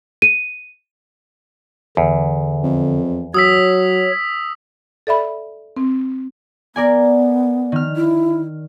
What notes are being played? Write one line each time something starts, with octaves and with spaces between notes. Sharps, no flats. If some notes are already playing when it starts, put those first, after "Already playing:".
D#7
E2 D3
F2
F#3 C#5 D#6 E6 B6
A4 D5 E5 B5
C4
B3 A#4 D5 G#5
D#3 F6
E4